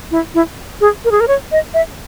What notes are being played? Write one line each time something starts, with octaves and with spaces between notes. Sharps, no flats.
E4
E4
G#4
A#4
G#4
A#4
C#5
D#5
E5